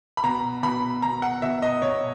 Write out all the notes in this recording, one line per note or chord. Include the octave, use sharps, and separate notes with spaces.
B5
B2 A#5
B2 B5
B2 A#5
F#5
B2 E5
D#5
B2 C#5